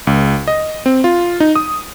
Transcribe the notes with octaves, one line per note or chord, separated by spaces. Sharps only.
C#2
D#5
C4
F4
D#4
D#6